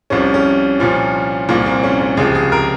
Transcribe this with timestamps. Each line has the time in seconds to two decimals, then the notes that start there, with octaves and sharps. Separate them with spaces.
0.10 C2 C3 F3 C#4
0.34 C#4
0.80 C2 A#2 F3 C#4
1.49 C2 A#2 F3 A#3
1.66 C4
1.83 C#4
2.00 C#4
2.17 C#2 C3 F3 G#4
2.35 G#4
2.52 A#4